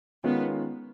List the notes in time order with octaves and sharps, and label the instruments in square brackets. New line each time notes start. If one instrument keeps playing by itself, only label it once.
[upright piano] D#3 G#3 C#4 F4 [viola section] B3